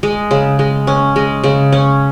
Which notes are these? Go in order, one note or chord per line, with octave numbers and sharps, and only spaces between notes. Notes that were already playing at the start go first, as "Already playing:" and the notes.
G#3
C#3
G#3
C#4
G#3
C#3
C#4